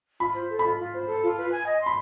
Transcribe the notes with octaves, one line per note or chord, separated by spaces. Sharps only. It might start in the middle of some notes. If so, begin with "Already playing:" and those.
F4 B5
C5
A4
F4 B5
F4
C5
A4
F4
B4
G#5
D#5
C6
B5